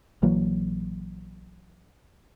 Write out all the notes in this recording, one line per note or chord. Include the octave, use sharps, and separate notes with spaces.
A#1 E3 F#3 A#3